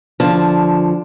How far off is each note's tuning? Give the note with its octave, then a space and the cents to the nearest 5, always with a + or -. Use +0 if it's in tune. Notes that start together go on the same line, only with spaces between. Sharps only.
D3 +0 F3 +0 A5 +0